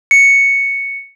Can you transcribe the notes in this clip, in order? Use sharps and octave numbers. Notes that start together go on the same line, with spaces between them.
C#7